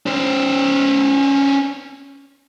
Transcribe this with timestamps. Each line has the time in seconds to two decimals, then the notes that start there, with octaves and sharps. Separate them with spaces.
0.06 C#4 C5